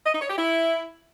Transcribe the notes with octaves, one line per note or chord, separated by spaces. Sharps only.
D#5
D#4
C#5
G4
E4